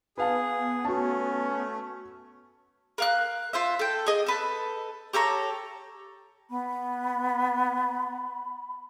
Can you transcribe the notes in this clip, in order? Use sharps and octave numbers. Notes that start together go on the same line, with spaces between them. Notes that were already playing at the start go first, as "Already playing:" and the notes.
B3 G#4 B4 F5 A5
A3 C#4 F#4 A5
A#4 F5 F#6
F4 C5 E5
A4 G5
G#4 D#5
A4 B4 A5
G4 A4 C#5 A#5
B3 B5